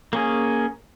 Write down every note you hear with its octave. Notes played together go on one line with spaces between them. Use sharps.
A#3 C#4 G#4